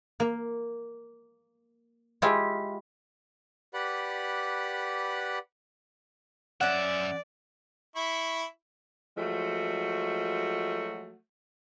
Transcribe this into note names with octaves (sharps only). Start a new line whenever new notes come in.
A#3
G#3 E4 F4 G4
G4 B4 D5 F#5 B5 F#6
F#2 C#4 D5 E5 F#5
E4 B5 C#6
F3 F#3 G#3 A3 F#4